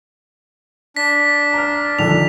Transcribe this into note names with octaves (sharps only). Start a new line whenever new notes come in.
D4 B6
A#5 F6
A#1 D3 D#3 F7